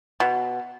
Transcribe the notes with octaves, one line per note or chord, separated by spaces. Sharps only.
B2